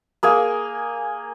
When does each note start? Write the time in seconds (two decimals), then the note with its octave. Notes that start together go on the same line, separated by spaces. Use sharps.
0.23 A#3 G#4 G#5